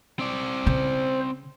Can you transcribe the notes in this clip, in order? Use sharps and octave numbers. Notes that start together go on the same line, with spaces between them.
C4 D5
C#3 C5